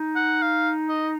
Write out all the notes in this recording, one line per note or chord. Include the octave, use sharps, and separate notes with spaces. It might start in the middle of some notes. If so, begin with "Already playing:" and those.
Already playing: D#4
F#5
F5
D#5